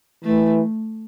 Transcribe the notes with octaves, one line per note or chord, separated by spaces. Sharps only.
E3 A3